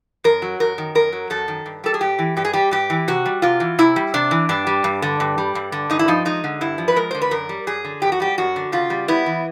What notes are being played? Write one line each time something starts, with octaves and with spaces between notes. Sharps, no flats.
F#2 A#4
F#3
F#2 A#4
D#3
F#2 A#4
F#3
F#2 A4
D#3
G2
G3 A4
G#4
G2 G4
E3
G2 G4
G#4
G3 G4
G2 G4
E3
C3 F#4
G3
C3 F4
E3
C3 E4
G3
C3 D4
E3
G2 D4
G3
G2
D3
G2
G3
G2
D3
G2 D#4
E4
F3 D#4
G#3 D#4
D3
G2 E4
F3
B4
G#3 A#4
D3 C5
B4
F#2 A#4
G3
F#2 G#4
D3
F#2 G4
F#4
G3 G4
F#2 F#4
D3
C#3 F4
G3
B3 E4
E3